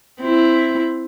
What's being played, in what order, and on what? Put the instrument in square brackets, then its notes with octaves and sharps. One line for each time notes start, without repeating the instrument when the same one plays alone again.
[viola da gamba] C4 E4